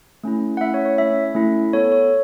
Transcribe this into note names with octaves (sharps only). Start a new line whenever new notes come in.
A3 C#4 E4
F#5
A3 C#4 E4 E5
C#5
C#5
A3 C#4 E4 E5
A3 C#4 E4
B3 A4 C#5
C#5